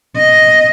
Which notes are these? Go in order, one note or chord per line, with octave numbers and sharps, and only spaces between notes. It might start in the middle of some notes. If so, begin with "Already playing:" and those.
D#5